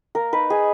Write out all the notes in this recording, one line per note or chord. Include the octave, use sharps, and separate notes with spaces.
A#3 A#4
D#4 B4
D#4 G#4